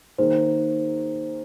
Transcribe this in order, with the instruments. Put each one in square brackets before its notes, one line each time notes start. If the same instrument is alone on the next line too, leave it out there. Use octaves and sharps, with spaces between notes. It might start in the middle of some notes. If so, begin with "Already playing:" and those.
[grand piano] D#3 A#3 G#4 [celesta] C5